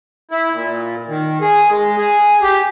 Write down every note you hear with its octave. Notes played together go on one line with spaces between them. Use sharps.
E4
A#2
D#3
G#4
G#3
G#4
G4